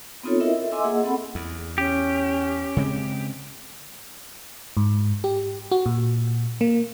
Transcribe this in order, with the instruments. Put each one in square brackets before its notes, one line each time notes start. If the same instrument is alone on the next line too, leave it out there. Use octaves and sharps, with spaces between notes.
[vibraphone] B3 C4 D#4 F4 A4 C#5
E4 A#4 D#5 E5
A4 E5
D#5 E5 G#5 C6 D6 E6
A#3 G#4 D#5 F#5
C4 A4 F#5 B5
[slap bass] E2
[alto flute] C#4 [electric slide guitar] G4
[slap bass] C#3 G#3 C4
[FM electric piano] G#2
G4
F#4
A#2
A#3